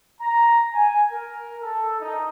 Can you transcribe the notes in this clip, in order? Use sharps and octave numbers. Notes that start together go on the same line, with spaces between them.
A#5
G#5
A#4
A4
D#4